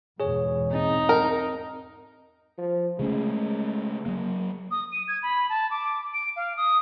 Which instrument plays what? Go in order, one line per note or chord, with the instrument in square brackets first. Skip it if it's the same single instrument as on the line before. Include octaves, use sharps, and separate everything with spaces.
[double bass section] E2 G#2 B2 [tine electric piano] G#4 C#5
[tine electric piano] C4 [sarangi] D#4
[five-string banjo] A#4
[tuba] F3
[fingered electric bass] C#3 A3 C#4 [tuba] G#3
[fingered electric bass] F#3 A#3
[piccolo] D#6
D#7
G#6
B5
A5
D6
D7
F5
D#6